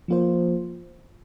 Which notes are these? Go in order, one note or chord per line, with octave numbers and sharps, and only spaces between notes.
F3 A#3 F4 C5